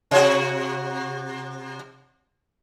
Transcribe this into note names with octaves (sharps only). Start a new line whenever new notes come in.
C3 F#4